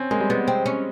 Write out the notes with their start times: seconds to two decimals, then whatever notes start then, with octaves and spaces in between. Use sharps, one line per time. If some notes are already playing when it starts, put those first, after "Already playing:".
Already playing: C4 C#4
0.11 G#3 A#3
0.20 G3
0.30 G#3 B3
0.48 C4
0.66 C#4